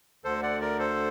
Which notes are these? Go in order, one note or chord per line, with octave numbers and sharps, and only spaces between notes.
D2 D3 A4 C5
D5 F#5
A#4 D5
A4 C5